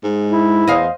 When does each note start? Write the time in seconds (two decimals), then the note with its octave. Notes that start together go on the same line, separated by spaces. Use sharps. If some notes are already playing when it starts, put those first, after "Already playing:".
0.04 G#2 G#3
0.31 E4
0.68 E2 C5 D#5 F5